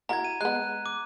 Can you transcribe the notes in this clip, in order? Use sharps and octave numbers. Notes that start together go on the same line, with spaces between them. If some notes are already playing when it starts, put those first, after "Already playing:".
E4 F#4 A#4 A#5 G#6
D#7
G#3 B3 F#6
D6